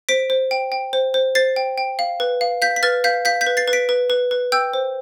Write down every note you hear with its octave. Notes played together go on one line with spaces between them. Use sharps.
C5 B6 D7
C5
G5
G5
C5
C5
C5 A6 C7
G5
G5
F5
B4
F5
F5 G6 B6
B6
B4 F6 A6
F5 G6 B6
F5 G6 B6
G6 B6
B4
A6 C7
B4
B6 D7
B4
B4
B4
G5 E6 G6
C5